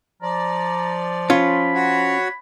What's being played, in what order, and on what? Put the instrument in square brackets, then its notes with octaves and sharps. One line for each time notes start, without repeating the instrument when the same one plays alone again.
[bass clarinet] F3 [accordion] D5 [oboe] A#5
[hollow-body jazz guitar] C#4 F4 [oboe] B5
[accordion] F#4 C#5